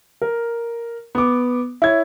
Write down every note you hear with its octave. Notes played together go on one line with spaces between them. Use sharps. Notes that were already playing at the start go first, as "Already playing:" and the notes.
A#4
B3 D6
E4 C#5 G#6